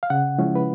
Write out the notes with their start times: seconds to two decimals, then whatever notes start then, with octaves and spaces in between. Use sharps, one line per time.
0.03 F5
0.10 C#3 F#5
0.39 F3 G#3 C#4 E4
0.56 B4